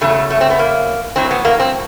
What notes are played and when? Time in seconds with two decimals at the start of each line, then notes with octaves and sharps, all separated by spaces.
0.01 E2 C#3 F#3 A3
0.30 A3
0.41 C4
0.50 B3
0.59 A#3
1.16 A2 F#3 C4
1.31 B3
1.45 A#3
1.60 C4